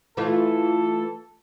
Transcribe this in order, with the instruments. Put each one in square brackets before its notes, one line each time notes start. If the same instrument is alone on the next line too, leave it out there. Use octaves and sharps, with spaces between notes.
[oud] E3 A3 F4 [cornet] A4